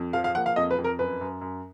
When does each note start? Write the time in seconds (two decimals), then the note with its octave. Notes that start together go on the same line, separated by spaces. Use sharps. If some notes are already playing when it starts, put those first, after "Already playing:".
Already playing: F2
0.13 F3 F5
0.24 F5
0.35 A#3 F#5
0.46 F5
0.56 F2 D#5
0.71 B4
0.78 F2
0.84 A#4
0.99 F#2 B4
1.21 F#2
1.41 F#2